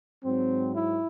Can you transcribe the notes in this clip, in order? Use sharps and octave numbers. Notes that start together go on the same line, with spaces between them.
G#2 F#3 C4
E4